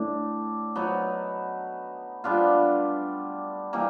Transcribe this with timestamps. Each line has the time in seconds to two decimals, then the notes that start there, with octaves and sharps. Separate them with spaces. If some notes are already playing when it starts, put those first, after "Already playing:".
Already playing: A2 A3 D4
0.76 F#3 B3 D#4
2.24 G3 B3 D4 F4
3.73 E3 G3 A#3 D#4